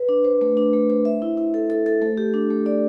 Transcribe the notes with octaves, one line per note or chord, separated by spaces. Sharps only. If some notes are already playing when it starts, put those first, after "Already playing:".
Already playing: B4
D4
C5
A3
D4
A3
C5
E5
E4
E4
A4
A4
A4
A3
G4
D4
A3
D5